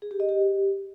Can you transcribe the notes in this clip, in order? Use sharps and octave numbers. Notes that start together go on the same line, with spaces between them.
G#4
G4
D#5
G4